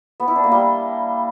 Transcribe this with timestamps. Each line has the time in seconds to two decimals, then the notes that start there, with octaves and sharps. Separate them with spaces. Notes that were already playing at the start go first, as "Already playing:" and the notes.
0.20 B3
0.28 E4
0.36 D4
0.44 A#3
0.52 G3